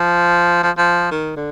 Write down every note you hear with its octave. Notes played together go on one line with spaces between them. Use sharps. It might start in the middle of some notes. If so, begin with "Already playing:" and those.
Already playing: F3
F3
F3
D#3
D3